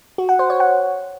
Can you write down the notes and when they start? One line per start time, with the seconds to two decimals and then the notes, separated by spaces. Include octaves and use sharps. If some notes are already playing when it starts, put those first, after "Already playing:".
0.18 F#4
0.29 F#5
0.39 C5
0.50 C#5
0.60 F#5